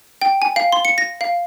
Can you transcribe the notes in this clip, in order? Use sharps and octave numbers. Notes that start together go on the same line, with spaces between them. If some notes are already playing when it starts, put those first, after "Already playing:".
G5
G#5
F5
C6
C#7
A#6
F5